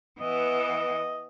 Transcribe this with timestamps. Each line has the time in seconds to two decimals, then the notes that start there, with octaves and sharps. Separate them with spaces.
0.20 E3 B3 D#5